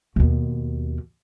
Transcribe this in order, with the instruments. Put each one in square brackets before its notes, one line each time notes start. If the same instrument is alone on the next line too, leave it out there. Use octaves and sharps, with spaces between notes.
[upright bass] D#2 B2